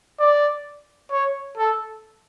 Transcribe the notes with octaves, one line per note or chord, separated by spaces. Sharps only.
D5
C#5
A4